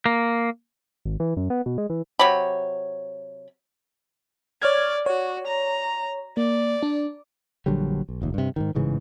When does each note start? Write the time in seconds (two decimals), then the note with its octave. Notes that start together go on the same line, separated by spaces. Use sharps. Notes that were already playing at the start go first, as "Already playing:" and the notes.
0.06 A#3
1.05 G#1
1.20 E3
1.37 F#2
1.50 B3
1.66 B2
1.78 G#3
1.90 E3
2.19 C3 F#3 C#5 B5
4.62 C#5 D5 F6 G#6
5.06 F#4 C#5
5.47 A#5
6.37 A#3 D5
6.83 D4
7.66 A#1 D3 F#3 G3
8.09 B1
8.22 F1 D#2
8.34 G2 C3
8.56 G#2 B2 D#3
8.75 A1 G#2 C#3 E3